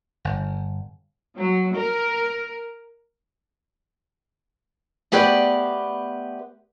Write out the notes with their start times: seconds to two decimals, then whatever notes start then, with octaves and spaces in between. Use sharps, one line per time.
0.25 G1
1.38 F#3
1.74 A#4
5.12 A3 B3 G4 B4 C5 D5